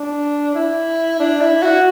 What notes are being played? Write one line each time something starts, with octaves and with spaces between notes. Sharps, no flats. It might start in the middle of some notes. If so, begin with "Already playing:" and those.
Already playing: D4
E4
D4
E4
F#4